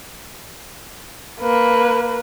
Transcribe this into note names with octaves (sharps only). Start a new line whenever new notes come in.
A#3 B4